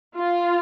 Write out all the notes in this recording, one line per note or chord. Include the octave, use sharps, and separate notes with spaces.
F4